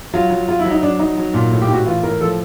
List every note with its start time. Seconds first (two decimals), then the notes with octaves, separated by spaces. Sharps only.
0.14 F#3 F4
0.31 F#3
0.48 F#3 F4
0.60 E4
0.65 F#3
0.71 D#4
0.83 F#3 D4
0.99 F#3 D#4
1.18 F#3
1.34 A#2
1.52 A2
1.62 G4
1.69 A2 F#4
1.86 E3 F4
2.03 A2 A#4
2.21 F3 A4